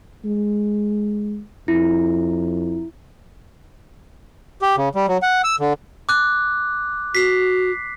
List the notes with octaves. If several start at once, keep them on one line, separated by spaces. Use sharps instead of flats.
G#3
F2 E4
G4
C#3
G3
F#3
F#5
E6
D3
D6 F#6
F#4 B6 C7